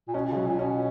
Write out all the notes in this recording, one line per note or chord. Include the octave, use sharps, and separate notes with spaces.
A#2
B2 C#4
A#2
C#3
B2 F#3
A#2
B2 C#4